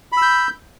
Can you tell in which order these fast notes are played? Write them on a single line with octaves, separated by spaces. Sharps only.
B5 E6 G6